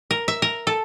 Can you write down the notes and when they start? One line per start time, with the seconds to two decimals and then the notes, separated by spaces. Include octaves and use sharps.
0.11 A#4
0.28 E5
0.42 A#4
0.67 A4